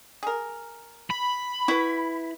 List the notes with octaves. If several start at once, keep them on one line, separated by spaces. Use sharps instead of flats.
G#4 A#4
B5
E4 F#4 B4